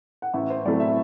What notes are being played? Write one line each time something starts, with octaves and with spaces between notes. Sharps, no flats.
F#5
A1 E5
C5
A2 F#3 A3 C4 D5
E5